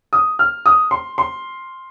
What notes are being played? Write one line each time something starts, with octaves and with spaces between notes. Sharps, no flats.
D#6
F6
D#6
C6
C6